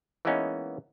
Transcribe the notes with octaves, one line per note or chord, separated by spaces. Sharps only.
E3 G#3 A#3 B3 C#4 D#4